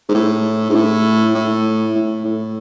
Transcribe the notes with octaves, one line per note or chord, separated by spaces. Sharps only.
G#2
A2
G#2
A2
A2
A2
A2